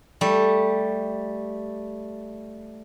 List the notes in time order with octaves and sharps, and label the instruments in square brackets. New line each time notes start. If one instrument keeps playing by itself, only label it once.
[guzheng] G3 A3